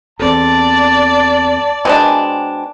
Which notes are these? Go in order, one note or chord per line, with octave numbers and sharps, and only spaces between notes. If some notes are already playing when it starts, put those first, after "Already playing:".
E2 C4 A4 D5 A5
B2 G#3 D4 C5 G5 G#5